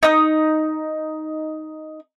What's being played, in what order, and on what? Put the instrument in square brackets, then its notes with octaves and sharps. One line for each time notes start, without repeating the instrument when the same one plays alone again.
[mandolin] D#4 D#6